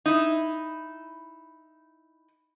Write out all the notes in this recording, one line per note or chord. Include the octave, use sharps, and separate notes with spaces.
D#4 E4